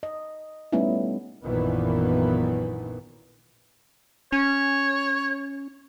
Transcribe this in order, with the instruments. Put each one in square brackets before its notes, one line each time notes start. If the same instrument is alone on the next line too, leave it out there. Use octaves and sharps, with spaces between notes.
[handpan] D#5
G3 A3 B3 C#4 D#4 E4
[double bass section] A#1 F#2 A#2 D#3 E3 B3
[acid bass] C#4 [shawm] C#5